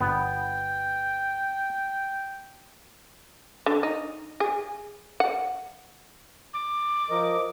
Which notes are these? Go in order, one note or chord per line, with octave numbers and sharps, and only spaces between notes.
G1 B3 G5
D3
D#4
G#4
F#5
D6
F3 A#4 D#5